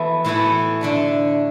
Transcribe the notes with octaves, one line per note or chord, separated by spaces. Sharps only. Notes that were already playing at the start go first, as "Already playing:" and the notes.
Already playing: E3 B3 F#4 A4
A2 E3 B3 F#4 A4
D3 A3 D4